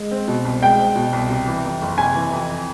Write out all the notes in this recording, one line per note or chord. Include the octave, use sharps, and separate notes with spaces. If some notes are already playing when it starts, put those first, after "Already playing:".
Already playing: G#3
C4
B2
C2
G#3 G5
C4
B2
C2
C3
E3
F2
F#1
C3 G#5
E3
F2